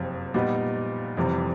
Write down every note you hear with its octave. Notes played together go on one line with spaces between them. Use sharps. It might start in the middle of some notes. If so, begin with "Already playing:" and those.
Already playing: F#1 F2 C3
A#2 G3 B3 D#4
F1 F2 C3 E3 G3